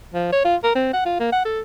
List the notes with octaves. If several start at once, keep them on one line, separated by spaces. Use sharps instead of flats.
F3
C#5
F4
A#4
C4
F#5
F4
A#3
F#5
A4